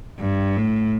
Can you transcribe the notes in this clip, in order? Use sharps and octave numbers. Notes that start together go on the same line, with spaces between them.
G2
A2